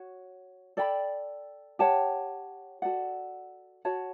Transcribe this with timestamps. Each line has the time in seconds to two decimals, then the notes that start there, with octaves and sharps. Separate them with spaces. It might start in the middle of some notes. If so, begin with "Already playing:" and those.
Already playing: F#4 C#5
0.77 A4 D5 G5 B5
1.79 G4 C#5 F#5 A5
2.82 F#4 A4 D5 F#5
3.85 F#4 C#5 F#5 A5